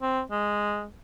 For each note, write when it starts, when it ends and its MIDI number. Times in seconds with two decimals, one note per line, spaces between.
0.02 0.21 60
0.31 0.86 56